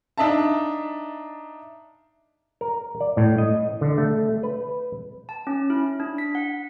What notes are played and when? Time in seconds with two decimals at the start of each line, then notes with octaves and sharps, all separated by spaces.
0.18 D4 D#4 E5 F5 A5
2.61 A#4
3.01 D5
3.17 A2
3.38 D#5
3.81 D3
3.98 A3
4.43 B4
5.29 A5
5.47 C#4
5.70 E4
6.00 D4
6.18 B6
6.35 F#5